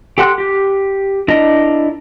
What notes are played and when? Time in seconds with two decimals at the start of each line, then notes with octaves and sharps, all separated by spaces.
0.18 G4 A4 F#5 C6 F#6
0.38 G4
1.28 D4 E4 A#4 D#5